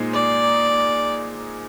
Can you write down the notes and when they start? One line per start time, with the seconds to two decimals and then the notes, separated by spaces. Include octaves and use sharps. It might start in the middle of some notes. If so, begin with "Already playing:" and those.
Already playing: A#2 G#3 D#4 G#4 C5
0.13 D5